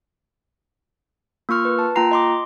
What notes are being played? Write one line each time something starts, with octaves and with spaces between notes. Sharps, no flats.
A#3 F4 C#6 F6
B4
A5
A#3 F4 G5 A#5 C7
D#5 C6 D6